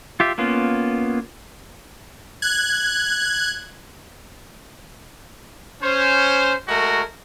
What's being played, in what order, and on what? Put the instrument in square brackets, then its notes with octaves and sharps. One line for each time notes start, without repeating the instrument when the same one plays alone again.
[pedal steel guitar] F4 G4 E5
A#3 B3 C#4 F4
[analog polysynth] F#6 G#6
[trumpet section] C#4 C5
G#3 A3 F#4 A#4